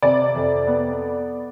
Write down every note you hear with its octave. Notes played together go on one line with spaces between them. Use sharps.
C3 D5
F2
B3